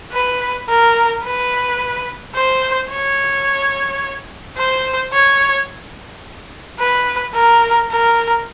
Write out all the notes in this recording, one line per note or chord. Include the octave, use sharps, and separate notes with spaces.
B4
A#4
B4
C5
C#5
C5
C#5
B4
A#4
A#4